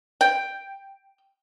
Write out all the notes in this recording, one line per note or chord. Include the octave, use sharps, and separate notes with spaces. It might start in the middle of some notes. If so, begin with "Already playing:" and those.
G5